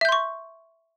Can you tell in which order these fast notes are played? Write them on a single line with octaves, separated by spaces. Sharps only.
E5 G6 C6 C#6